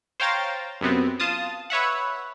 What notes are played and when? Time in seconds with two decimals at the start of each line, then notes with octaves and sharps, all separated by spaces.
0.20 C5 C#5 F5 G5 A#5 A6
0.81 F#2 C3 B3 C4
1.20 F4 A5 D#6
1.70 B4 C#5 E5 F#5